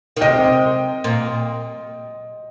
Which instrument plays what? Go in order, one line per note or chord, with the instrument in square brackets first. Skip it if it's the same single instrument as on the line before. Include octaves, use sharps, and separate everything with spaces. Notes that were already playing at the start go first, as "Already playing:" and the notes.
[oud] D#3
[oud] C3 [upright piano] D#5 G5
[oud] A#2